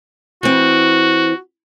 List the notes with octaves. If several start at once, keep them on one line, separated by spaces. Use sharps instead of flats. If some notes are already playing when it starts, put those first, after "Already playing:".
E3 C4 F#4